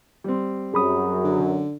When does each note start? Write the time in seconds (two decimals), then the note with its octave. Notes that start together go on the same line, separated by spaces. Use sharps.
0.24 G3 C4
0.74 F#2 F#3 G#4 B5 D#6
1.24 D3